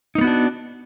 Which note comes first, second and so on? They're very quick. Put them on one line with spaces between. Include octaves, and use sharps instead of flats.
D#4 A#3 B3 F#4 D4